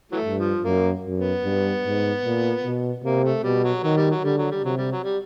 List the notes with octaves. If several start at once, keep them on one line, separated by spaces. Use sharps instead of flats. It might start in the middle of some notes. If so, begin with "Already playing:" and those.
E3 F#3 A3
G2
F3
F#2 A#3
F#2
B3
G2
G#2
A#2
B2
C3 A#3
A3
B2 G3
F#3
D#3 F#3
G3
F#3
D3 G3
F#3
G3
C3 F#3
G3
F#3
G3